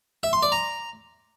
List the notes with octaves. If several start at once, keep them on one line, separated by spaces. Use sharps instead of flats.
E5
C6
D5
A#5